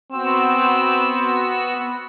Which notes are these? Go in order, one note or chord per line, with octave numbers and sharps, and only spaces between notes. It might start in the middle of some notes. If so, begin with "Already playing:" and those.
B3 C4 F#4 E6